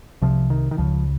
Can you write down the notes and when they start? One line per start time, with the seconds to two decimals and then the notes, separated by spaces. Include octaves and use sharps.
0.22 C2 C3 F3
0.50 D#3
0.71 D#3
0.78 C#2 C#3 F3